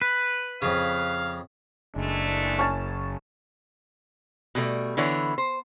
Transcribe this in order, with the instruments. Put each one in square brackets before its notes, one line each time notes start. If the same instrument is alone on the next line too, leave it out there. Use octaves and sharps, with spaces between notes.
[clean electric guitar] B4
[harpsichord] F2 C#3 [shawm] F5
[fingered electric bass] F#1 [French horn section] G#3 A3 D4
[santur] C#4 A5
[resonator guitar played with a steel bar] B2 G3 A3
D3 E3 B3 E4 C#5
C5